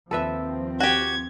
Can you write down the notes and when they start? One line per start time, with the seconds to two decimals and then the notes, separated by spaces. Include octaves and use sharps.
0.11 D#2 F3 C4 A4 B4 E5
0.80 F#4 G4 G#6